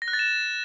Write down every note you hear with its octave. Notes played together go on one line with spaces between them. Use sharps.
A#6
F#6
A6
E7